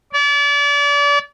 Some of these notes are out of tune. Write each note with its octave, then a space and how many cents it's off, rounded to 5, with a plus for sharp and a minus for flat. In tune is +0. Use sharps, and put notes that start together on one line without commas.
D5 -35